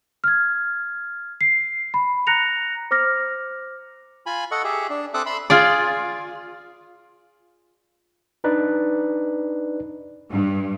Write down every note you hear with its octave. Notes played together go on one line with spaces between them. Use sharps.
F6 G#6
C7
B5
A#5 F#6 A#6 C#7 F7
C5 D6 F6 A#6
F4 G#5 B5
A4 D#5 F#5 C#6
G4 G#4 E5
D4
C4 A4 E5 D6 D#6 F#6
E5 B5 C6 E6
F4 G#4 D5
D4 D#4 B4 D5
G2